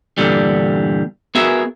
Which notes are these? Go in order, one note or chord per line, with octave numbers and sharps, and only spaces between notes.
E2 G2 A#2 D3 G3
B3 F#4 G#4 A#4 E5